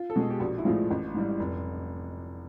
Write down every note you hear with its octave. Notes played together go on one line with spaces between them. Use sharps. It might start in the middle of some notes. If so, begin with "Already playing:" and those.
Already playing: F4
A4
B2 G#3 G#4
G4
A#1 F#4
E4
A2 F3 G#3 F4
A1
G#2 E3 G3
F1